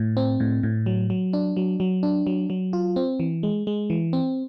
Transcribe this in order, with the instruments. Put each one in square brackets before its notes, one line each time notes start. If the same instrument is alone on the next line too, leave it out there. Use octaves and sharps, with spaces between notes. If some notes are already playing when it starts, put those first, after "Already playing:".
Already playing: [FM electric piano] A2
C4
A2
A2
F#3
F#3
D4
F#3
F#3
D4
F#3
F#3
F4
C4
E3
G#3
G#3
E3
C4